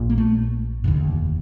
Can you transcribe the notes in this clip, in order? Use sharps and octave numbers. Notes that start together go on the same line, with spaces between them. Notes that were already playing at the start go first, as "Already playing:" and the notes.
Already playing: A#1 A#2
A#3
A3
F1 D#2 D3